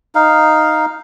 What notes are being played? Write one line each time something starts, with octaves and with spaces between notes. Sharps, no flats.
D#4 F5